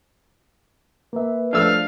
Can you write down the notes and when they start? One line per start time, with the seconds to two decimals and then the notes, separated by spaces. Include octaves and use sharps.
1.13 A#3 B4 E5
1.53 F3 A3 D4 F5 E6